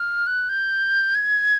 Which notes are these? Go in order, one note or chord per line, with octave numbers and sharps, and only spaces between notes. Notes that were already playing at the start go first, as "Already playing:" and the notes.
Already playing: F6
F#6
G6
G#6